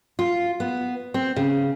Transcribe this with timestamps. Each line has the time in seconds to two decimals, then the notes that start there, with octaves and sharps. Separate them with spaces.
0.19 F4
0.60 B3
1.14 C4
1.36 C#3